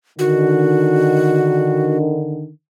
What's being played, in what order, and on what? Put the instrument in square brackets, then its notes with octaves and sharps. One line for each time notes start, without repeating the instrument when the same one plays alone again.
[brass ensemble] D3 D#3 [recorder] F#4